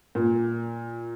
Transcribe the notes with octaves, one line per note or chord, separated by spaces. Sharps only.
A#2